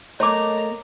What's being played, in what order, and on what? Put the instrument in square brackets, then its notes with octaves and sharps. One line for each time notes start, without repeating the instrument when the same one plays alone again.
[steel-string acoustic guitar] A3 A#3 [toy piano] C#5 D6 [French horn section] D#5 [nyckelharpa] A#5